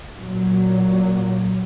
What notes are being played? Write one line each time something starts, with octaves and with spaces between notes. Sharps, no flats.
A#2 F#3